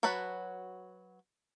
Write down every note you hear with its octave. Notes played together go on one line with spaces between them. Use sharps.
F#3 F#4 B4 A5 B5